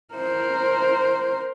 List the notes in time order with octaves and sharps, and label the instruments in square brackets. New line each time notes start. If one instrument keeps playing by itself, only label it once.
[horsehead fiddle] A#4 C5